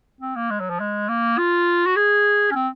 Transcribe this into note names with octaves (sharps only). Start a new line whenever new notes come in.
C4
A#3
G#3
F#3
F3
G#3
A#3
F4
F#4
G#4
C#4
C4